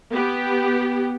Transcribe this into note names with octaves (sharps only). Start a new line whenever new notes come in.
B3 G4